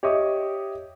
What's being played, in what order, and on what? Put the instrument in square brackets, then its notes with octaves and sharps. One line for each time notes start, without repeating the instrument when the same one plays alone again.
[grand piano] G4 C#5 D#5 E5 D6 D#6